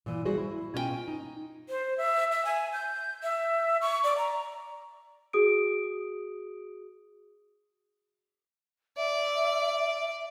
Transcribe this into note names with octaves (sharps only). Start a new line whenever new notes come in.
A#2 E3
G3 F#4 G#4 C5 E5
E4
B2 C#4 F4 D#5 G5 G#5
D#4
C5
E5
E5
G#5
G6
E5
C#6
D5
A#5
F#4 G#4 D#6 D7
D5 E5